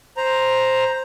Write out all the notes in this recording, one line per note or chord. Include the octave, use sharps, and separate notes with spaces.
C5 A#5